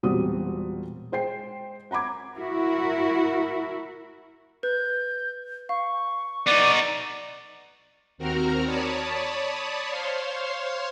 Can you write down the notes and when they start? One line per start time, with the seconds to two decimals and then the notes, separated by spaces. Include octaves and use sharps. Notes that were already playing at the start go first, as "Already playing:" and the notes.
0.03 E1 A#2 G3 C4 F#4 D#6
1.12 G#3 C5 G5 C7
1.91 F#5 A#5 B5 D6 G#6
2.34 E4 F#4 A#4
4.63 B4 G6
5.69 F5 C#6
6.47 B3 D#4 D5
8.18 D#2 C4 F#4 A#4 A#5 F6
8.65 C#5 D5 A5 B5 D#6
9.90 C5 C#5 F5 C6